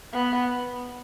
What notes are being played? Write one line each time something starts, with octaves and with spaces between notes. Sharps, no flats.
B3